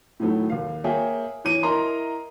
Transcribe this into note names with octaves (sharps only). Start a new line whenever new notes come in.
A2 D#3 F#3 A3
D#2 F5
A#3 G#4 C#5 E5 F5 G5
E3 C#5 D6 D#7
E4 A#4 D#5 A#5 C6